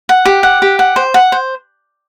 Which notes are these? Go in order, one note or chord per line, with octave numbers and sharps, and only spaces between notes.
F#5
G4
F#5
G4
F#5
C5
F#5
C5